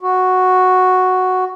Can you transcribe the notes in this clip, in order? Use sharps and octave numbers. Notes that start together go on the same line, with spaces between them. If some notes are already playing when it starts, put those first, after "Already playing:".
F#4